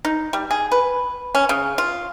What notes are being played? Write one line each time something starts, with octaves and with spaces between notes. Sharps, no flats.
D#4
G3
G#4
B4
C#4
C#3
F4